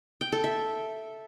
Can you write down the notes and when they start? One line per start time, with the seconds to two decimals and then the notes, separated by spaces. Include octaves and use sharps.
0.21 G5
0.32 A4
0.44 E5